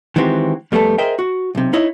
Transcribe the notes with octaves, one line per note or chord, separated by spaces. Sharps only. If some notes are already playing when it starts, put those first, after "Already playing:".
D#3 E3 G#3 C4 F#4 G4
F2 G3 A3 B3 A4
G#4 A#4 C5 D#5 E5 G5
F#4
B1 C3
D#4 E4 C#5 D#5